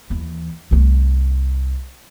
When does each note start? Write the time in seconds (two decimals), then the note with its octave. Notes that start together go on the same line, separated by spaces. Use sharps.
0.10 D#2 E3
0.71 C2 A3